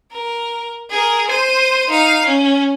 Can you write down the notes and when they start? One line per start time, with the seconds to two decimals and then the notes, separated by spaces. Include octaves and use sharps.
0.12 A#4
0.90 G#4 A#4
1.30 C5 D#7
1.90 D#4 F5
2.24 C#4